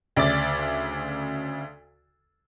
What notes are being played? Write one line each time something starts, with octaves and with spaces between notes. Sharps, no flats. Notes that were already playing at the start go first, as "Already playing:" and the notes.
D2 C#3 D5 E5 D6 A6